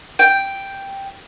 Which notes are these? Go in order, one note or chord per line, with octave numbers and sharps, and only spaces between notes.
G5